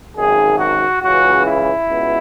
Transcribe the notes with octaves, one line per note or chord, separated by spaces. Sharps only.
G#1 F#2 D#3 G#4
F#4
C#2 C#3 E3 F#4
E4
C#2 B2